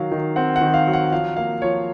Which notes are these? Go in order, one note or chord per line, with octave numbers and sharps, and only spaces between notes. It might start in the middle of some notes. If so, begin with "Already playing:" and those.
Already playing: D#3 F#3 F5
D#3
C4 F#5
F#5
D#3
F5
F#3
F#5
F3 F5
A#3 F5
F3 C#5